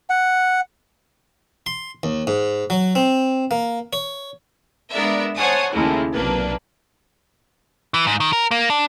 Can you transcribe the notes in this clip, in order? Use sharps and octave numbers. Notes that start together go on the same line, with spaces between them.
F#5
C6
D#2
G#2
F#3
C4
A#3
C#5
G#3 B3 D4 A#4 D5 E5
C5 C#5 F#5 G#5 A5 D#6
D#2 A2 C#3 G#3 A#3 E4
B1 C3 A#3 D4 B4
E3
G#2
D#3
A#4
A#3
D4